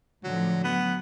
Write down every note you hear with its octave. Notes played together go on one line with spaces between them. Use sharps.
A2 D3 F3 F#3
F#3 B3